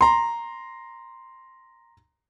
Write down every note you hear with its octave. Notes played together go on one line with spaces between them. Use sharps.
A#5 C6